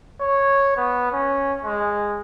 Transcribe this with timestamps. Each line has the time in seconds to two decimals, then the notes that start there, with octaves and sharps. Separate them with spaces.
0.21 C#5
0.77 B3
1.12 C#4
1.64 G#3